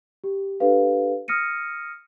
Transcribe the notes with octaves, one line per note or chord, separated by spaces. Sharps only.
G4
D4 G4 A4 B4 F5
D#6 F6 A#6 C#7 D#7